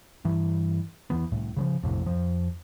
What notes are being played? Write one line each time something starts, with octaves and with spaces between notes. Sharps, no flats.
G2 E3
E2 E3 B3
C2 A2
C#3 E3 F3
A#1 F2 A2 C3
F2 F3